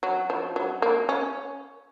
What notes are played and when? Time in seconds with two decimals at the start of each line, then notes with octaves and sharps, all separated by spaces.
0.03 F#3
0.30 F3
0.56 F#3
0.82 A#3
1.09 C#4